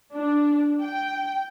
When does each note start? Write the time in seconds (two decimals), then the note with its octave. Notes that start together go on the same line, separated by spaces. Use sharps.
0.15 D4
0.82 G5